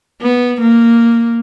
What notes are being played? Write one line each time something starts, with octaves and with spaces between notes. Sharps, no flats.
B3
A#3